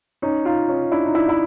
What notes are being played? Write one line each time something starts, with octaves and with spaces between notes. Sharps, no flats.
C#4 D#4
D#4 F4
C#4 D#4
D4 E4
D#4
D4 E4
E4